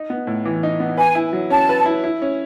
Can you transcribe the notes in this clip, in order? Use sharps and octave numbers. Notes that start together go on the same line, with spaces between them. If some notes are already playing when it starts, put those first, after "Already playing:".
Already playing: D#4
B3
A2
E3
D#4
B3
B4 G#5
E4
F#3
C#4 A5
B4
E4
E4
C#4